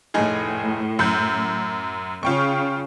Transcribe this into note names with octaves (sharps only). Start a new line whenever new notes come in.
F1 A2 D#4 G#4
F#2 G6
C#3 F4 G5 C#6